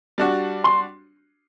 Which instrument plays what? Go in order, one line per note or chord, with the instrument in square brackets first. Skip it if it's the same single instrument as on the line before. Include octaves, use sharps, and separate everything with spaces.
[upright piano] G3 D4 F#4
[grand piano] C6